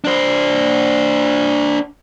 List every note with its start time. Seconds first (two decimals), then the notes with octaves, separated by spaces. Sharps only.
0.05 D4 C5